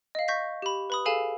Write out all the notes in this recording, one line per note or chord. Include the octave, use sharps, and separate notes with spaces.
D#5 F5
C#6 G6 A#6 B6
G4 B5
B4 B5 D#6
G#4 A4 F5 G#5 E6 E7